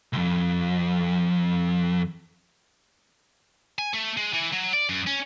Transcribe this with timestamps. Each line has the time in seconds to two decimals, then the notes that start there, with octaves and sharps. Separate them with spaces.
0.13 C2 F2
3.78 G#5
3.93 A3
4.17 G#3
4.33 E3
4.52 F#3
4.73 D5
4.89 F#2
5.07 C#4